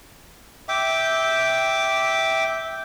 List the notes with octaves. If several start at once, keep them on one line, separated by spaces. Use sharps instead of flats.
E5 G5 D6